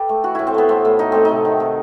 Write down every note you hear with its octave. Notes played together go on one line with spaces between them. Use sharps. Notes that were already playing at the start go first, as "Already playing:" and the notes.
Already playing: G4 A4 B4
A3
E3 F#4
A2 E4
C4
A3 B3
A3 C4
A2 B3
A3 D#4
A3 C4
C3 D#4
D#3
C3